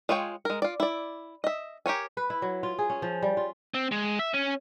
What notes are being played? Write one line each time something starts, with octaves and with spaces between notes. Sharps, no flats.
G#3 F4 C#5 G5
G#3 A#4
F4 D5
E4 D5
D#5 E5
G4 A#4 C#5 G#5
B4
E4
F#3
F4
G#4
C#4
F3
G3
F4
C4
G#3
E5
C#4